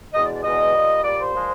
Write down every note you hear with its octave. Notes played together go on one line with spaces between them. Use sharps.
E2 B2 G#3 D#5
D5
D5
E2 B2 G#3 D#5
A#2 G3
A#2 G3 D5
C5
A#2 F3 G#3